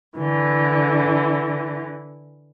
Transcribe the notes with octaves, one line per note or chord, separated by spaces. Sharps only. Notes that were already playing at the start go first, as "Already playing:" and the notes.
D3 E3